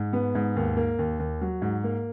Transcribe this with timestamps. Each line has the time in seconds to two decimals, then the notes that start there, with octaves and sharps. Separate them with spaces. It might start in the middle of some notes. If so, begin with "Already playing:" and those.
Already playing: G#2
0.13 B3
0.35 G#2
0.56 D#2
0.77 A#3
0.99 D#2
1.19 D#2
1.41 F#3
1.62 G#2
1.84 A#3